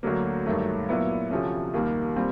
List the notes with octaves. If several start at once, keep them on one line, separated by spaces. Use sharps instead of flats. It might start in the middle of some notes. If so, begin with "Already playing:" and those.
D2 D3 F#3 A#3
G2 D#3 F#3 A3
A#2 F#3 B3 E4
D2 C3 F3 A3 C#4
D#2 D#3 G3 A#3
A#2 G3 C4